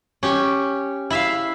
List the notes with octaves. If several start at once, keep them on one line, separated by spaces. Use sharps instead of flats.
C#4 G4
E4 E5 F5